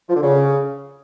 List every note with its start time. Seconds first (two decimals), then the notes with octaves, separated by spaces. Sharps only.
0.10 F3
0.16 D3
0.23 C#3